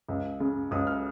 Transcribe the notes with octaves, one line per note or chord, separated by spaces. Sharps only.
C#2
C#3
C#2 D#6
F6